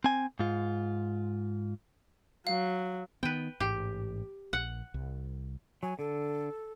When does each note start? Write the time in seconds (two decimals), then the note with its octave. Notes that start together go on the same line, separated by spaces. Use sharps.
0.04 C4 G#5
0.39 G#2 F4
2.47 F#3 F5
3.23 D#3 B3 B4 G5
3.60 A1 G#2 G4
4.53 A#1 F#5
4.94 C2
5.83 F#3 G#5
5.99 D3 A4